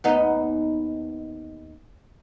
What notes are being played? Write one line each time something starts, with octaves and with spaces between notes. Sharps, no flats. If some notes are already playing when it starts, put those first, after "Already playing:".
D#2 B3 D#4